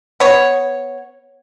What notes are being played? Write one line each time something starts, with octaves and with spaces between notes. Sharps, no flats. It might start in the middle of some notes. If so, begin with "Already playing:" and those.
B3 C#5